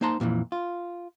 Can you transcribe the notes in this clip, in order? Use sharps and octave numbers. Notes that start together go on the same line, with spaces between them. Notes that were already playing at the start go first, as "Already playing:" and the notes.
A#3 D#4 C5 A5 A#5 C6
F2 A#2 D#3 E3
F4